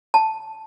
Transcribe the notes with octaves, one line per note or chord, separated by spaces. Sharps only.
A5